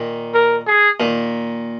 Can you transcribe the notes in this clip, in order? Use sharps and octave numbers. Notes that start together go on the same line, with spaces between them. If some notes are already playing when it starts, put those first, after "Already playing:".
Already playing: A#2 D#3
A#4
G#4
A#2 D#3